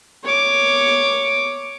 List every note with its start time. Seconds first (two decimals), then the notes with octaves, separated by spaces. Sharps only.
0.24 C#5 D6